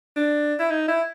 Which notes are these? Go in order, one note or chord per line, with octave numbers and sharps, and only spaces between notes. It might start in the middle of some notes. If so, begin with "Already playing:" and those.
D4
E4
D#4
E4